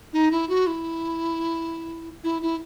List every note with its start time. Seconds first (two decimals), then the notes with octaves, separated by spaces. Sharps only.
0.13 D#4
0.32 E4
0.49 F#4
0.67 E4
2.24 E4
2.42 E4